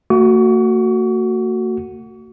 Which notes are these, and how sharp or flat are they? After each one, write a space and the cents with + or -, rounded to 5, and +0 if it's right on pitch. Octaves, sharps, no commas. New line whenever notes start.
A3 +45 F#4 +0 C#6 +40